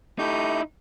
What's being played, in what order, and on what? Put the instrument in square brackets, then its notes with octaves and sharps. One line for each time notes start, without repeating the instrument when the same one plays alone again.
[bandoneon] A3 G4 G6 [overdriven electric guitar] D#4 E4